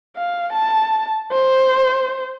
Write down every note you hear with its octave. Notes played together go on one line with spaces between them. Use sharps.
F5
A5
C5